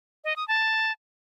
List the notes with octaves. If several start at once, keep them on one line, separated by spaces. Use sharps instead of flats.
D#5
D#6
A5